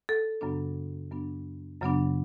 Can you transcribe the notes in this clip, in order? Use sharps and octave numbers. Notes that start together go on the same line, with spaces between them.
A4
F#2 C#3 F#3 B3 D4
F#2 C#3 F#3 B3 D4
F#2 C#3 F#3 B3 D4